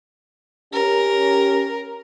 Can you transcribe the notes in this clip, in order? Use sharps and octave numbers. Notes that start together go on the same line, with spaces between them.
C#4 G4 A#4